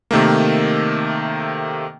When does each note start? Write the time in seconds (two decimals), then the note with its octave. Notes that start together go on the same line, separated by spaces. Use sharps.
0.11 C3 D#3 A3 A#3